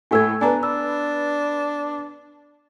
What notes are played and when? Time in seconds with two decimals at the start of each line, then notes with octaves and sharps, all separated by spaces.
0.11 A2 A3 G#5 E6 G#6
0.41 B3 D4 B4 G#5 A#5
0.63 D4 E6